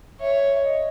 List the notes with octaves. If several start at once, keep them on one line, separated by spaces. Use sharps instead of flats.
C#5 E5
D#5